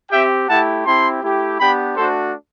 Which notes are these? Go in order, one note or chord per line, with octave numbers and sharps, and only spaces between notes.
C4 G4 E5 G5
A3 E4 G4 F#5 A5
C4 E4 G4 A5 C6
A3 E4 G4
B3 D4 G4 G5 B5
A3 D4 F#4 A4 C5